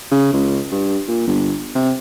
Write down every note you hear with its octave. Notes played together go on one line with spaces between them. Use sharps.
C#3
C#2
G2
A#2
G1
C3